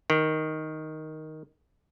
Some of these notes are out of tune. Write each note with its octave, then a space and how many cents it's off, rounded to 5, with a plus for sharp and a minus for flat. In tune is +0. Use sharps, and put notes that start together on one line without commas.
D#3 +5